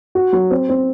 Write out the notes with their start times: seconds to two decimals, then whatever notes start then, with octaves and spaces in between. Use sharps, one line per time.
0.15 F#4
0.32 F#3
0.51 C4
0.69 C4